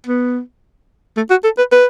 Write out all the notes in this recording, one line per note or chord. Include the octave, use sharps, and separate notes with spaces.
B3
A3
F#4
A4
B4
B4